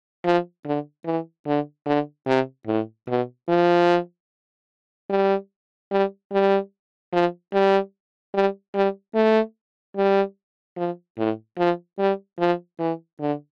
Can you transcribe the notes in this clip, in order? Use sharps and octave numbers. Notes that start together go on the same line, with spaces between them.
F3
D3
E3
D3
D3
C3
A2
B2
F3
G3
G3
G3
F3
G3
G3
G3
A3
G3
F3
A2
F3
G3
F3
E3
D3